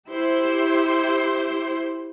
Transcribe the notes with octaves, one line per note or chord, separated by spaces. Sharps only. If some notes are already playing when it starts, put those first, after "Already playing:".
E4 G4 C5 C6